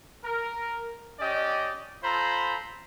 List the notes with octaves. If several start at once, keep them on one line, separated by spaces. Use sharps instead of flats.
A#4
C#4 G4 D5 D#5
F4 A4 C5 A#5 B5